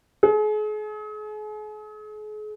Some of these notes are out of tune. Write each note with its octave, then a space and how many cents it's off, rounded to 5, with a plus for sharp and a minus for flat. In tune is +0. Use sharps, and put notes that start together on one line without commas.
G#4 +40